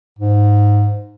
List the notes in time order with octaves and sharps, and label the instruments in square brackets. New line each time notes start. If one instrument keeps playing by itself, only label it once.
[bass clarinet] G#2